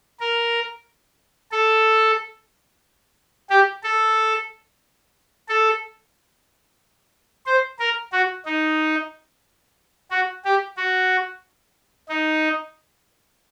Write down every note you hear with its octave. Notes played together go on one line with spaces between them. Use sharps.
A#4
A4
G4
A4
A4
C5
A#4
F#4
D#4
F#4
G4
F#4
D#4